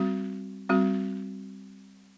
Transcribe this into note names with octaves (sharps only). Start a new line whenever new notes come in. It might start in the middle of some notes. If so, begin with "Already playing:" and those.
Already playing: G3 C4 F#4
G3 C4 F#4